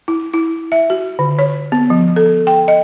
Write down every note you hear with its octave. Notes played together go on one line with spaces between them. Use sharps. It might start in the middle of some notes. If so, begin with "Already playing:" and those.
E4
E4
E5
F#4
D3
C#5
B3
F3
A4
G5
D#5